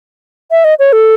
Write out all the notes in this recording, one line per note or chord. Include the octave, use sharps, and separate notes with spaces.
E5
D#5
C#5
A4